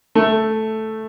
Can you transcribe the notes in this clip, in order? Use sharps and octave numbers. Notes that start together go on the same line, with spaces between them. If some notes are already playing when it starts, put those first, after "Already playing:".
A3